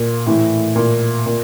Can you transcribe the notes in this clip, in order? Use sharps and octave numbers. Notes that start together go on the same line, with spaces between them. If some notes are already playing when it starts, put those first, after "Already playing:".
Already playing: A#2
A2 E3
A#2
A#2